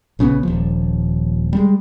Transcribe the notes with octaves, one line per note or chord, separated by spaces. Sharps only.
A#1 C#3 E3 B3
D#1 F3
G3 G#3